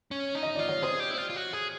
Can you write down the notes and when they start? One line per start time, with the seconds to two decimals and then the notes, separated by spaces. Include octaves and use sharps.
0.11 C#4
0.35 D#4
0.43 D#5
0.55 F4 D5
0.68 C#5
0.82 G#4 C5
1.00 G4
1.11 E4
1.18 F4
1.30 F4
1.36 F#4
1.53 G#4